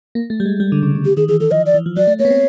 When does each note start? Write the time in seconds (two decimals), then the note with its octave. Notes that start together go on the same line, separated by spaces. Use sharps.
0.15 A#3
0.30 A3
0.40 G3
0.46 G#3
0.60 G3
0.72 D3
0.83 C#3
0.95 C#3
1.05 D3 G4
1.17 D#3 G#4
1.28 E3 G#4
1.40 E3 A4
1.51 F3 D#5
1.66 D5
1.74 E3
1.86 F3
1.97 F#3 D5
2.07 A3
2.19 A#3 C#5
2.25 B3
2.30 C4